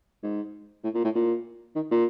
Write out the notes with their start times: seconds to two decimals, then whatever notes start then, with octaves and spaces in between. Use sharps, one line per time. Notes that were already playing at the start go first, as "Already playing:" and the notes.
0.23 G#2
0.84 A2
0.94 A#2
1.04 A2
1.15 A#2
1.76 D#3
1.91 A#2